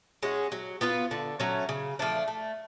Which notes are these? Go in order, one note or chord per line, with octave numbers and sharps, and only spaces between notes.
G#3 C#4 F#4
F#3
B3 F4 B4
D3
F#3 A3 C#4
C#3
F3 A3 D4
A3